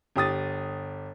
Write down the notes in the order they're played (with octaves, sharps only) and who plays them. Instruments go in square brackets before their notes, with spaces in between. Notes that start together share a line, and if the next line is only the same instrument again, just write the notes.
[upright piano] G1 G4 D#6 A6